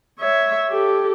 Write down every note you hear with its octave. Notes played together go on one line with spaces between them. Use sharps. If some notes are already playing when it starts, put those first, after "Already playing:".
C#5 E5
G4 A4